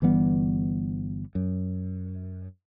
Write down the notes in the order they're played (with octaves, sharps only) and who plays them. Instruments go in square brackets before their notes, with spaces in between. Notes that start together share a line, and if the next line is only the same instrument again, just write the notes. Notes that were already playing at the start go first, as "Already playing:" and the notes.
[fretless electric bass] G1 E3 G3 B3
F#2